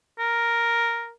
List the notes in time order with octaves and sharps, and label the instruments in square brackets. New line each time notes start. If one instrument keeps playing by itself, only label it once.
[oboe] A#4